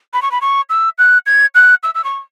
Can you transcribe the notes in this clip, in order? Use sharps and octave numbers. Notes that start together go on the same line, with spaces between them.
B5
C#6
B5
C#6
E6
F#6
G#6
F#6
E6
E6
C#6